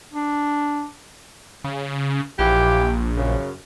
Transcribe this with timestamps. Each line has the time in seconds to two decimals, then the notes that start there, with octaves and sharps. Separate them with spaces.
0.13 D4
1.64 C#3
2.39 A#1 E3 F4 G4
3.16 F#2 C#3